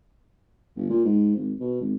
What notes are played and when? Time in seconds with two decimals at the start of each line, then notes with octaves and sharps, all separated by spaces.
0.76 G1
0.90 A#2
1.05 G#2
1.36 G#1
1.60 B2
1.81 G#1